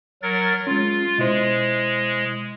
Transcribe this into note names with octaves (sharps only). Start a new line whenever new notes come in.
F#3 A#4 A6
G#3 C#4 F4
B2 G#3 E4 C5